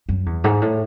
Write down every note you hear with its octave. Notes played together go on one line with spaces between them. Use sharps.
F#2
E2
G#2
A2